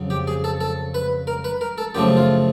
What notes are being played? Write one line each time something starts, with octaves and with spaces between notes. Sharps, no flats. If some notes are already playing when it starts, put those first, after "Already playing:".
Already playing: F2 C#3 F#3
G4
G#4
A4
A4
B4
A#4
B4
A#4
A4
F#2 C#3 F3 A3 G4
F4